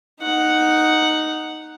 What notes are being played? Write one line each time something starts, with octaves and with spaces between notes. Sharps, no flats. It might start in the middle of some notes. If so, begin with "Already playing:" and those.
D#4 F#5